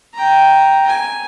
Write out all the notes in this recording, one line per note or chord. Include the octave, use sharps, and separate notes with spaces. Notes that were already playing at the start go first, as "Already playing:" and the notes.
G5 A#5
G#5